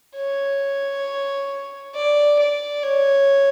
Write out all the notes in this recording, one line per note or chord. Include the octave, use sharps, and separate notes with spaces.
C#5
D5
D5
C#5